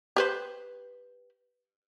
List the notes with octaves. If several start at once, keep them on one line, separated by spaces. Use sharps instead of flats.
G4 B4 C5